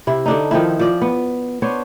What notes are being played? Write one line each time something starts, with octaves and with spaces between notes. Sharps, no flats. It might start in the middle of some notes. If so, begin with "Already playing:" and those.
C3 E4
D3 D4 D#4
D#3 F3 C4 E4
F3 D5
B3
B3 D4 C5 C#5